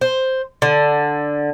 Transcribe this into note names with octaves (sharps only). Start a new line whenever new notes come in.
C5
D3